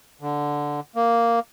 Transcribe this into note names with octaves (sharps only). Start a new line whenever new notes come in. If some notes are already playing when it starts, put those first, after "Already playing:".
D3
A#3